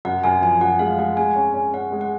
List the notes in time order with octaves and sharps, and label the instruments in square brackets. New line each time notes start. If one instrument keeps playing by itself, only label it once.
[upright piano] F#2 [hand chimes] F#5
[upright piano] F#2 [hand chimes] G#5
[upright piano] F3 [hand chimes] G#5
[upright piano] F#2 [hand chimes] F#5
[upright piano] G#3 [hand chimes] F5
[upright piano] G#3 [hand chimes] F#5
[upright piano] G#3 [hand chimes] G#5
[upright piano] C#4
C#4
[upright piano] C#4 [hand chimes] F#5
[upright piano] G#3
[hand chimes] F#5